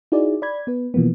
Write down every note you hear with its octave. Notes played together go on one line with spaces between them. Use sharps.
D#4 E4 F#4 G#4 D5
D5 B5 G#6
B3 B4
B2 E3 F3 A#3 B3